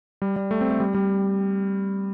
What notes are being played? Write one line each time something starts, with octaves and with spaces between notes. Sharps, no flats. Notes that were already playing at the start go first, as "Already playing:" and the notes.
G3
G3
A3
C4
A3
G3
G3